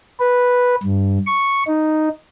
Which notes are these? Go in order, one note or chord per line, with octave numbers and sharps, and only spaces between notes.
B4
G2
C#6
D#4